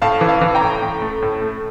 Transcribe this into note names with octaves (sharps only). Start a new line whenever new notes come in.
A2 F5 A5
E3
F5 A5
E3
G5 A#5
A2
A2
A3
A2
A3